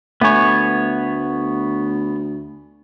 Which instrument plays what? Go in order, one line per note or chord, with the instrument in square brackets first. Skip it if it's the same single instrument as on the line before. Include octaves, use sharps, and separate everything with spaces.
[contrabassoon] D2 [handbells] A3 G#5 [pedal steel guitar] B3 C#5